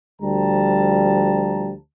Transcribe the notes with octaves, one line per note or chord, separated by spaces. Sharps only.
D2 F3 G3 A5 A#5